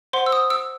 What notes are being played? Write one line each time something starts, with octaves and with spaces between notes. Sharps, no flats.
C5 F#5 C6
E6
D#6
E6